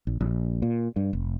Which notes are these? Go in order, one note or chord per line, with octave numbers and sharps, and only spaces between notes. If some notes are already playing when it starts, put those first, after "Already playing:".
A#1
A#1
A#2
G2
F1